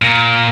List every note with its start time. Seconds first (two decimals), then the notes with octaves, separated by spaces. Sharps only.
0.02 A#2